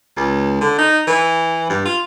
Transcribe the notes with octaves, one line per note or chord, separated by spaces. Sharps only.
C#2
D3
D#4
E3
G2
F4